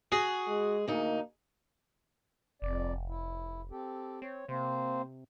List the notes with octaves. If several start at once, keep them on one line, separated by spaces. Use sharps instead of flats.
F#4 G#4
G#3
D2 A#3 D#4
F1 F2 D5
E4
C4 G4 A4
C4 C#5
C3 A#3 C4 C5